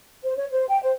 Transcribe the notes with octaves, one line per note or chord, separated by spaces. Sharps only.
C5
C#5
C5
G5
C5